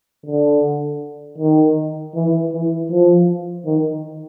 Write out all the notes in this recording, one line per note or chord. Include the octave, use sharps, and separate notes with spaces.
D3
D#3
E3
E3
F3
D#3